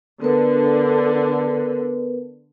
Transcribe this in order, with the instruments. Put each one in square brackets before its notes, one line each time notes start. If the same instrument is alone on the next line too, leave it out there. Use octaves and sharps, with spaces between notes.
[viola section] D3 [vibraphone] B3 A#4 B4